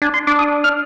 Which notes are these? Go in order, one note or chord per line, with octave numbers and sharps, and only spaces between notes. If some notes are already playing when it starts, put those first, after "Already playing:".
D4 G#5
C6
D4 D6
D#6
F6